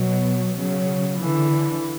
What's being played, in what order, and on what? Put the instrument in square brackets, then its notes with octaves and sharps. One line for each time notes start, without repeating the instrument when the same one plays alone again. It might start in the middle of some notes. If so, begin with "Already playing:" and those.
Already playing: [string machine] B2 [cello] F#3
[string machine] C#3 [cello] F#3
[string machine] D3 [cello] E3